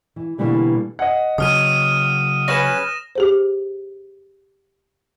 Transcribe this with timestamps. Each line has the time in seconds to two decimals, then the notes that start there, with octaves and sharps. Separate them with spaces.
0.16 E3
0.38 B2 D3 E3 G3 A#3
0.99 D#5 F#5
1.38 C#3 F#3 D#6 F6 D#7
2.48 C#4 G#4 B4 A#6 E7
3.15 G4 G#4 C5